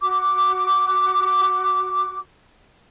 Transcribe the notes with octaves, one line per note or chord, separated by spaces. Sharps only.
F#4 D6